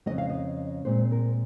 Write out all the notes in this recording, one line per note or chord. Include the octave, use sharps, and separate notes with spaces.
F2 C#3 F#3 D#5
F5
D#5
A#2 G#3 C4 C5
A#4